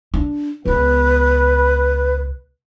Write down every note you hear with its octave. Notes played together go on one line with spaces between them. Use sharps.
D4
C#2 B3 B4